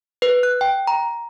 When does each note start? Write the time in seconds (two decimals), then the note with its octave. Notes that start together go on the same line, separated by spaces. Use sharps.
0.22 B4
0.43 F#6
0.61 G5
0.87 A#5